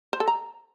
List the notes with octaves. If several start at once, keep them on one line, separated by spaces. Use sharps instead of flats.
C5
A4
A#5